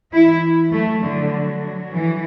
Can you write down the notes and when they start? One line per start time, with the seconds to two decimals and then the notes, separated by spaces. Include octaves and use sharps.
0.13 E3 E4
0.72 F#3 A3
1.03 D3
1.92 E3